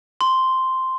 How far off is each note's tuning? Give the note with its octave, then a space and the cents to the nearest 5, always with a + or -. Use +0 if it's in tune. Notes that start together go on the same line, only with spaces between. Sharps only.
C6 -5